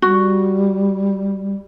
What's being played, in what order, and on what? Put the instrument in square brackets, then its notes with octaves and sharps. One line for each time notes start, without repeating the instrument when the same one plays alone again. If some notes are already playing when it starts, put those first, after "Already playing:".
[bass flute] G3 [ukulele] F#4